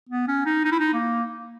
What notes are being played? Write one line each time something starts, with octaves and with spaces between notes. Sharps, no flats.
B3
C#4
D#4
D#4
E4
D#4
A#3